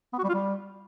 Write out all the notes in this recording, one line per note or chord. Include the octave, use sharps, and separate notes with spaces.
B3
F#4
G3
F4
G3